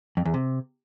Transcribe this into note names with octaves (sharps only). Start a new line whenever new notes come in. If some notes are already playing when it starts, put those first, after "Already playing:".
F2
E2
C3